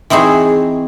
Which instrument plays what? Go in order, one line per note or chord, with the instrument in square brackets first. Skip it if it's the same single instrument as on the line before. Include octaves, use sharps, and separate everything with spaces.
[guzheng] E3 C4 D#4 G#4 C#5